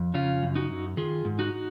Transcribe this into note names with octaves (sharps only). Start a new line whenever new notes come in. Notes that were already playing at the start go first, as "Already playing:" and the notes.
Already playing: F2
C#3 C#4 F4
F#2
D#4 F#4
F#2
D#3 F4 G#4
G#2
D#4 F#4